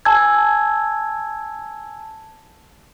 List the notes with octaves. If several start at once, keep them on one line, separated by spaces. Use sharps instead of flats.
G#5 A5 E6 G#6